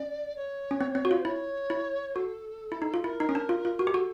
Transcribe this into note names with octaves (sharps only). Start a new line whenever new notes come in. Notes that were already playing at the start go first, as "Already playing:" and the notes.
Already playing: C#4 D5
C#5
C#4
C4
C4
F#4
F4
C5
E4 C#5
E4
F#4 A4
E4
D#4
F4
E4 A#4
D#4
C#4
D4
F4
F4
F#4
G4
F#4 A4